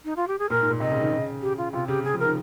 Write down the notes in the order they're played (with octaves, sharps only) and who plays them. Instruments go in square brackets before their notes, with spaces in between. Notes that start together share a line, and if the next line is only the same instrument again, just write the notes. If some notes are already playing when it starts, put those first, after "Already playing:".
[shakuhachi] D#4
F4
G4
G#4
[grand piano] A#2 [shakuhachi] A#4
[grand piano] G#2
A#2
[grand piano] C3 [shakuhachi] D#5
[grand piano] C#3
D#3
C#3
[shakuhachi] G4
F4
[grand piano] C3 [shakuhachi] F4
[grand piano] C#3 [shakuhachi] G4
[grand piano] C#3 [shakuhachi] G#4
[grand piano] F3
[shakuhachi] A#4
[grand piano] D#3